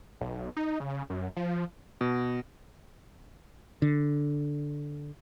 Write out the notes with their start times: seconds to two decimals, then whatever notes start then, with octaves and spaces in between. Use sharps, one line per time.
0.21 B1
0.57 D#4
0.80 C#3
1.10 F#2
1.36 F3
2.01 B2
3.82 D3